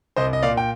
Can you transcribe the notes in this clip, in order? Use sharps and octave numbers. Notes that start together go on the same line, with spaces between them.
C2 C5 D#5
D#5
A#2 D5 F5
G5